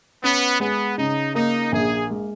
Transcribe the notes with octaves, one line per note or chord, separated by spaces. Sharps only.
B3 C#4
G#3 B3
C#3 D#4
A#3 D#4
A#1 G#4
G#3